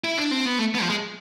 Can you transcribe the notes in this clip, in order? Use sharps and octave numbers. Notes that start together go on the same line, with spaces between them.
E4
D4
C4
B3
A3
B3
F3
G#3